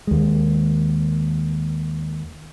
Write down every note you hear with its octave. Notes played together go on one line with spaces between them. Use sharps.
D#2 G#3